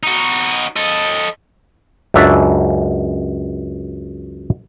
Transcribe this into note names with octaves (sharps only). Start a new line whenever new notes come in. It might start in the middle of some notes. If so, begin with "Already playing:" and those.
D#4 F#4
A4 D#5
C#2 F#2 D4 E5